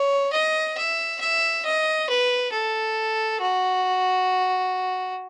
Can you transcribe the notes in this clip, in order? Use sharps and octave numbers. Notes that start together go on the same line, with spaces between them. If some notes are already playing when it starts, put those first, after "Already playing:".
Already playing: C#5
D#5
E5
E5
D#5
B4
A4
F#4